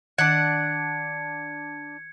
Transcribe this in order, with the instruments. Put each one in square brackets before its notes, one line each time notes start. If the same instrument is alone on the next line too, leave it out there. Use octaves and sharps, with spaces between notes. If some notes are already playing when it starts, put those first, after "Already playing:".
[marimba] D#3 [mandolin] D4 F#5 [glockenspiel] G#6 C#7